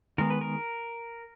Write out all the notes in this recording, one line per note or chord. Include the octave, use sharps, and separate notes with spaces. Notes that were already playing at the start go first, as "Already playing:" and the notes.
D#3 G#3 B3 A#4
B4
A#4